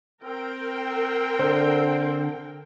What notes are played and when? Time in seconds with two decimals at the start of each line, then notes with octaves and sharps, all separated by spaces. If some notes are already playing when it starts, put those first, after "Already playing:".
0.24 C4 A#4 G5
1.39 D3 C5